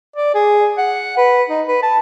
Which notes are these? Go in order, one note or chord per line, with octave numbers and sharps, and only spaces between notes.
D5
G#4
F#5
B4
D#4
B4
A5